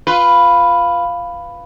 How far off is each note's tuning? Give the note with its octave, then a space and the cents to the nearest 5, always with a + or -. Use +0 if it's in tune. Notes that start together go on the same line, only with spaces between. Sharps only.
F4 +0 B4 +5